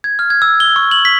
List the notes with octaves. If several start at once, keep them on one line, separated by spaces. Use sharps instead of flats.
G#6
F6
G#6
E6
G7
C#6
F#7
B6